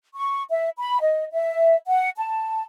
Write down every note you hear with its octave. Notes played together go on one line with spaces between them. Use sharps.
C#6
E5
B5
D#5
E5
F#5
A5